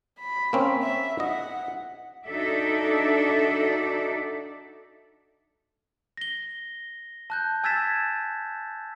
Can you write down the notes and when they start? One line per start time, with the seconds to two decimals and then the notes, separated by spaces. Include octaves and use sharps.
0.19 B5
0.53 A#3 C4 C#4
0.83 E5
1.20 D#5 F#5
2.28 D4 D#4 F#4 A4 D5 E5
6.17 A#6 G7
7.30 A5 F#6 G6
7.64 G#5 E6 G#6 A6 B6 E7